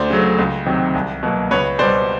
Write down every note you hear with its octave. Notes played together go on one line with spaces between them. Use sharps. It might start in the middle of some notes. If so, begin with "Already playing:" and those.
Already playing: D2 C5 D5
C#3 F#3 A3
C#2
C3 D#3 F#3
C2
B2 F#3 A#3
C#2 B4 C#5
B2 G3 C5 D5